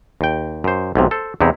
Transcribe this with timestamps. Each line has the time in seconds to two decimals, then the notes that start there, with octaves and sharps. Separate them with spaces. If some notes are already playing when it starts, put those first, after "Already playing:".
0.21 D#2 G5
0.64 F#2 C5
0.95 B1 G#2 C3
1.11 A4 C5
1.41 E2 C3 D#4 E4